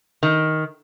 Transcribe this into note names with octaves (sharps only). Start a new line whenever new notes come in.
D#3